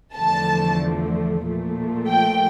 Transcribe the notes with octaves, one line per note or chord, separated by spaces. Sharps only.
E2 D3 F3 A3 A5
A#2 F3 A3
G5